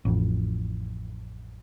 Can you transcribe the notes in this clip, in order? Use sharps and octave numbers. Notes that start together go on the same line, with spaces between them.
A1 F2